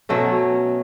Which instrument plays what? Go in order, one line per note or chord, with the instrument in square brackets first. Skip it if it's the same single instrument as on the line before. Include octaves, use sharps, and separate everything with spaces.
[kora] B2 F#3 A3 C#4